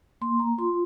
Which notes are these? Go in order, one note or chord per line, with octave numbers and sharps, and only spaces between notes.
A#3 C6
A#5
F4 C6